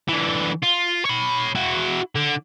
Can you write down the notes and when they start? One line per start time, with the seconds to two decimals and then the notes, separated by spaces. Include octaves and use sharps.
0.08 D3 E3
0.63 F4
1.05 C#5 B5
1.55 E4 F#4
2.15 D3